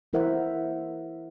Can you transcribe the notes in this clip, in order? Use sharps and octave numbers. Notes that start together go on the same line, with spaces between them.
E3 E4 A#4 C5 E5 F#5